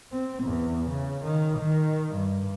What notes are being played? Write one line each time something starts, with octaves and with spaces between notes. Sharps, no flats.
C4
E2
C#3
D#3
D#3
G2